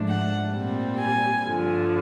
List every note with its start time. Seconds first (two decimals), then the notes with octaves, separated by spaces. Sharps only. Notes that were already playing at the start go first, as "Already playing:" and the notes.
Already playing: G#2 F3 A3 D4
0.08 F#5
0.53 A#2 G3 C4
0.99 G#5
1.45 G2 D3 F3